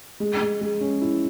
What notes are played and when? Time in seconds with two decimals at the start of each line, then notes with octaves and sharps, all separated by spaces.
0.20 G#3
0.41 G#3
0.61 G#3
0.81 C#4
1.02 E4